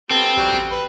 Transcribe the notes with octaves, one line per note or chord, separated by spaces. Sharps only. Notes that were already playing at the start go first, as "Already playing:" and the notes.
G3 B3 C4 A4
A#1 F#3 G3 F#4
A1
B4